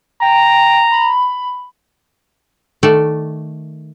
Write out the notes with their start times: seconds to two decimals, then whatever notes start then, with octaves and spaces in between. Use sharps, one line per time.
0.22 G5 A#5
0.92 B5
2.83 D#3 A3 A4 D5